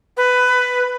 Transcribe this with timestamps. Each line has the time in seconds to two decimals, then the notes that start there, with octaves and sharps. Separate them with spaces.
0.17 B4